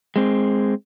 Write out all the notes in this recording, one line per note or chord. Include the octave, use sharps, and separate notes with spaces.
G#3 C4